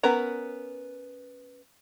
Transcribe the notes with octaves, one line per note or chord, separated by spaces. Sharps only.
B3 C#4 A#4 B4 A#5